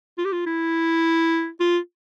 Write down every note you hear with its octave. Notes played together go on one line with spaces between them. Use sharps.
F4
G4
F4
E4
F4